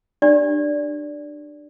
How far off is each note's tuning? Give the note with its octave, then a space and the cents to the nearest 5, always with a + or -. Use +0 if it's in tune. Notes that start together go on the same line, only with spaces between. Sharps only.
D4 +25 G4 +0 D5 -15